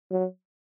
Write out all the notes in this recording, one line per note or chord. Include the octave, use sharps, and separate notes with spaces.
F#3